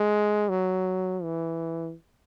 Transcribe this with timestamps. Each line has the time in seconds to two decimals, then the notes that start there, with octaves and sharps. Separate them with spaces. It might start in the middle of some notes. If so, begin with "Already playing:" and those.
Already playing: G#3
0.49 F#3
1.23 E3